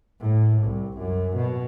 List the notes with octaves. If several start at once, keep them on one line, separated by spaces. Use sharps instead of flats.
A2
C2
F#2
B2